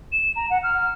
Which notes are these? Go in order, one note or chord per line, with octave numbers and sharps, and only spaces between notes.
E7
A#5
F#5
F6